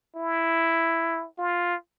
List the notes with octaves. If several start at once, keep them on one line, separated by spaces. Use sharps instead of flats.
E4
F4